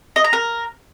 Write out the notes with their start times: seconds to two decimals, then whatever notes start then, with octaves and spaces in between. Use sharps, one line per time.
0.16 D#5
0.24 A#5
0.33 A#4